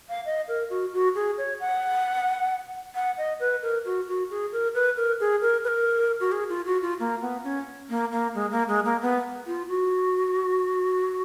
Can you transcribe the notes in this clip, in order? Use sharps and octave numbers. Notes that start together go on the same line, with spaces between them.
F5
D#5
A#4
F#4
F#4
G#4
C#5
F#5
F#5
D#5
B4
A#4
F#4
F#4
G#4
A#4
B4
A#4
G#4
A#4
B4
A#4
F#4
G#4
F4
F#4
F4
A#3
B3
C#4
A#3
A#3
G#3
A#3
G#3
A#3
B3
F4
F#4